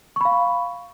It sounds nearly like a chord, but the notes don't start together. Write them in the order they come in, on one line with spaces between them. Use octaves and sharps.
C#6 B5 F5